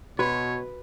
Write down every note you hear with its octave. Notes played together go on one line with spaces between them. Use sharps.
B2 F#4 B4 C#5